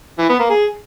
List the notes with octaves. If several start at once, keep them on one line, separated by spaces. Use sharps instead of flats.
E3
B3
A#3
G#4